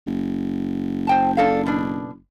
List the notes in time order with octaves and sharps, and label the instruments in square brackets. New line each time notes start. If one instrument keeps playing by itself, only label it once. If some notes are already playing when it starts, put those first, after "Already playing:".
[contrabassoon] F#1
[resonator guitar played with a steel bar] C5 G5 A5
D4 A4 F5
B2 D4